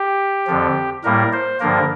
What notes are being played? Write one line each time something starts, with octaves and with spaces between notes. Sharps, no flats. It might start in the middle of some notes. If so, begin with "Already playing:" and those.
Already playing: G4
F2 D3 F3
A2 G3 A#3 A#4
C5
G2 D3 F3 A#3 A#4